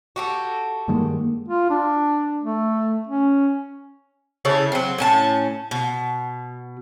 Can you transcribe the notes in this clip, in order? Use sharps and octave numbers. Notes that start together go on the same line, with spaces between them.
F#4 G4 A4
G2 D#3 G#3 A#3
F4
D4
A3
C#4
C#3 E4 A4 C#5
F#3 C4
A2 C#4 A5
B2